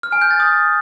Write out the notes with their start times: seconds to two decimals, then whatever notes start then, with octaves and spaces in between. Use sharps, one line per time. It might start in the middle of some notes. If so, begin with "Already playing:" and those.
0.03 F6
0.12 G#5
0.22 G6
0.31 A6
0.40 D#6